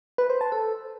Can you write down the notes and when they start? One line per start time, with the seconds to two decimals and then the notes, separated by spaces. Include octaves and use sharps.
0.18 B4
0.30 C5
0.41 A5
0.52 A4